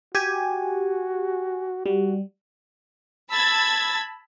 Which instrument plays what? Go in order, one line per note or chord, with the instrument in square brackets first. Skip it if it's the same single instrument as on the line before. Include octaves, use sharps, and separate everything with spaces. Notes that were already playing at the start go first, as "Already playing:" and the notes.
[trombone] F#4 [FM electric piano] G4 G#5
[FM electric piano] G3 [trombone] F#4
[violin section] A5 B5 E6 G#6 A6